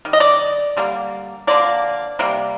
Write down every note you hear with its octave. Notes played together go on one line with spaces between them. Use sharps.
D#3 G3
D#5
D5
D3 G3 A#3
D3 F3 A#3 D5
C3 G3 A#3